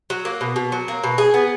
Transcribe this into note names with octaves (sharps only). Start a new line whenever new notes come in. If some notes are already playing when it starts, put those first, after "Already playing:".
F#3
A#3
B2
B2
F#3
A#3
B2
G#4
B3